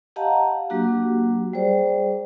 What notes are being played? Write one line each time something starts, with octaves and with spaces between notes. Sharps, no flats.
G4 D#5 F5 F#5 A5 A#5
F#3 A#3 D4 F#4 G4
G3 G#4 C5 D5